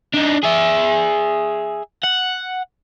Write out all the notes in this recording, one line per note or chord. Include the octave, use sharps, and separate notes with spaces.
D4 D#4
G#4 E5
F#5